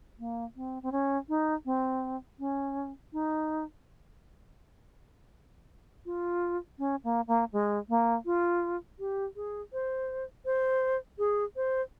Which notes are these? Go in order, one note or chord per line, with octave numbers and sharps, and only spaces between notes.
A#3
C4
C4
C#4
D#4
C4
C#4
D#4
F4
C#4
A#3
A#3
G#3
A#3
F4
G4
G#4
C5
C5
G#4
C5